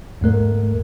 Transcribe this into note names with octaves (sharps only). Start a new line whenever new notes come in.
E2 G#2 A3 A#4